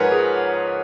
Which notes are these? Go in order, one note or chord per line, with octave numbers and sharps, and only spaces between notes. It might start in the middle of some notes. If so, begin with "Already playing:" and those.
Already playing: G#2 F3 A#4 B4 C#5 F#5 G#5
G#4